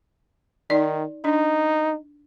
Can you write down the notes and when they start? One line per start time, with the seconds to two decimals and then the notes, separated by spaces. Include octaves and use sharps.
0.70 D#3 D#4 D5
1.25 D4 D#4